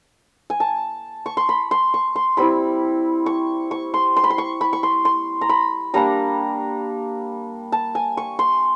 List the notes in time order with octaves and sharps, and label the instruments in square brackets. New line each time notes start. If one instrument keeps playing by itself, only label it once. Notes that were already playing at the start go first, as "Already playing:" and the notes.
[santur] G#5
A5
C#6
C6
B5
C6
C#6
C6
G3 C4 E4 B5
C#6
C#6
C6
C6
B5
C6
C#6
B5
C#6
C6
C6
A#5
B5
G3 A#3 D4 A#5
A5
G#5
C#6
C6